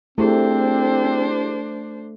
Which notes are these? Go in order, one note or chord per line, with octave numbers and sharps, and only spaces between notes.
A3 C4 D4 E4 G4 G#4 C5